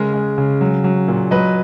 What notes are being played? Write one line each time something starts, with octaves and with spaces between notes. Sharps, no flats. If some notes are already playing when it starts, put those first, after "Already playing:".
Already playing: C#3 G#3 A#4
G#3
C#3
F#3
F#3
A#2
F#3 B4 D#5